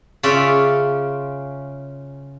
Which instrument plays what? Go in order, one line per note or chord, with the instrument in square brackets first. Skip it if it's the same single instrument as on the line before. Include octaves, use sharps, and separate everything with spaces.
[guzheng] C#3 C#4 F4 D5 E5